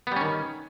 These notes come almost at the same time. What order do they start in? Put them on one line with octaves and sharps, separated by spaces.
B3 G3 C#4 D#3